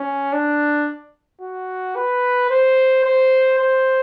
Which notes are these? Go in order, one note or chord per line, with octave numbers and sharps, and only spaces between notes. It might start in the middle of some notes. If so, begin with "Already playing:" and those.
Already playing: C#4
D4
F#4
B4
C5
C5
C5